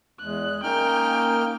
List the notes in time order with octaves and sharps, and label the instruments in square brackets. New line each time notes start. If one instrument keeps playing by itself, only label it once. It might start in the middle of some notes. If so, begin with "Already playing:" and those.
[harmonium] E2 [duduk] G#3 [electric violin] F#6
[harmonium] A#3 [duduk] C#4 [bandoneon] D#4 F6 [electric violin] G5